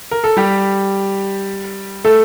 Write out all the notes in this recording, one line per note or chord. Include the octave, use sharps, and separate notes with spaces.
A#4
A4
G3 G4
A3 A4